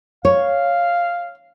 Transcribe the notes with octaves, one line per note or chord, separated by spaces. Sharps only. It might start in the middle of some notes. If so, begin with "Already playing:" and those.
C#5 F5